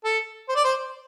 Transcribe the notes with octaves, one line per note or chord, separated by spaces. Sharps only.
A4
C5
D5
C5